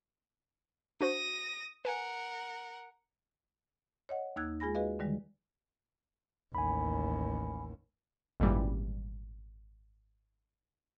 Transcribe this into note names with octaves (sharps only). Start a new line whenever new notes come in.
D4 F#4 C5 D#6 A#6
A#4 B4 F#5 G#5
C#5 D#5 F#5
D#2 A#3 D#4 E6 F#6 G#6
G#3 F4 G#4 G#5 B5 A#6
F#4 G#4 B4 D#5 F5
D3 D#3 G3 G#3
A1 D#2 G#5 B5
G#1 F#2 A#2 D3 E3 G3